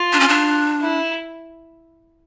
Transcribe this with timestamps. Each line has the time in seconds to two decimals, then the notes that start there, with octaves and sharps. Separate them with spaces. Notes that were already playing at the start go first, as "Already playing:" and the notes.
Already playing: F4
0.13 D4
0.20 C#4
0.28 D4
0.81 E4